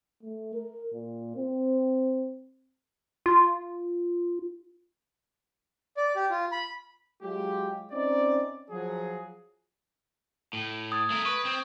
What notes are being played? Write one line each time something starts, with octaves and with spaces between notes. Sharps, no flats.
A3
A#4
A#2
C4
F4
D5
G4
F4
B5
F#3 G#3 F4 G4
C4 C#4 D#4 D5
F3 F#3 G#4
A2
D#6 G#6 A6
A3 A#4
B4 C#6 D7
C4